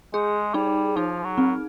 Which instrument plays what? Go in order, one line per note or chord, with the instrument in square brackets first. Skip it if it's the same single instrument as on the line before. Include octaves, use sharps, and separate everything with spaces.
[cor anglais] G#3 [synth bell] G#4
[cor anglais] G3 [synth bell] D#4
[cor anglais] F3 [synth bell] D#4
[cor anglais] F#3
[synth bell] C4